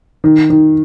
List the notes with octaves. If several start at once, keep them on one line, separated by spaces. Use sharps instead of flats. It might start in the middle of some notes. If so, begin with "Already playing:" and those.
D#3
D#3